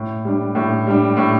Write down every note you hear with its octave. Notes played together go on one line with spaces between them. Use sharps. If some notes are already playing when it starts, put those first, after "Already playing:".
Already playing: A2
G3 D4
A2
G3 D4
A2